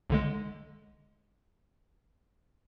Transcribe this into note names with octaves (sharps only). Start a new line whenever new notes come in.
B1 D3 G#3